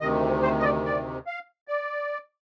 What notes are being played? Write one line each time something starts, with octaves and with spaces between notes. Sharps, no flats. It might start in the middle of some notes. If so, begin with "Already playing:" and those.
D2 C3 D#3 D#5
C5
D#5
D5
D5
F5
D5